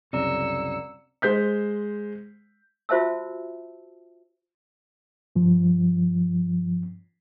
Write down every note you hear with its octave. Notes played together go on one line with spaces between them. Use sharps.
C2 F#2 C#3 C4 D5 A#5 E6 C#7
G#3 C5 G6 B6
F4 F#4 C5 E5 A5 E6
G2 F3